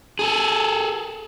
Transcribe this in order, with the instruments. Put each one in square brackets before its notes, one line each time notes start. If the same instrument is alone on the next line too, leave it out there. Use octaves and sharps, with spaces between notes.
[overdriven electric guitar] G#4 A4